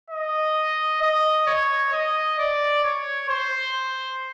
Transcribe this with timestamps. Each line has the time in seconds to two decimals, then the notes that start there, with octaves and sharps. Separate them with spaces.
0.10 D#5
1.01 D#5
1.47 C#5
1.92 D#5
2.38 D5
2.84 C#5
3.29 C5